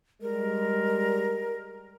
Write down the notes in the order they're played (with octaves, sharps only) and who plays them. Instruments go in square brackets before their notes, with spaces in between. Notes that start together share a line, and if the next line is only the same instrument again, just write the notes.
[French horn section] G3 G#3 [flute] A#4